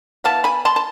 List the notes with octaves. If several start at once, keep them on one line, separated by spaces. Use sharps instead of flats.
E3 B3 F5 A5
G#5 B5
A5 C6
A5